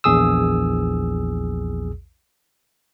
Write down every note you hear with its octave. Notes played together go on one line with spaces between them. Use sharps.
A#1 E2 G#4 D#6 E6